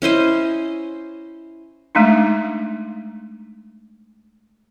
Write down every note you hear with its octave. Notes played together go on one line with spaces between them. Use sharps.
C#4 E4 C5 D#5
G#3 A3 D4 D#4